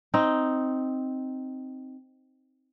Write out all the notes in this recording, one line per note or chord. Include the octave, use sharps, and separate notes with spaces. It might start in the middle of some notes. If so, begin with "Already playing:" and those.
C4 D#4